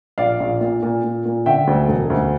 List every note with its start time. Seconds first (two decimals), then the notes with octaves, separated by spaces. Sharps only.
0.18 A#1 D5 F5
0.40 A#1
0.61 A#2
0.83 A#2
1.04 A#2
1.25 A#2
1.46 D3 E5 G5
1.67 D2
1.88 E1
2.10 D2